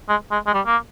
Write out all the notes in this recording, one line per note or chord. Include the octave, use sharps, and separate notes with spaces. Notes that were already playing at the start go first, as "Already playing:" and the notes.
G#3
G#3
G#3
G3
A#3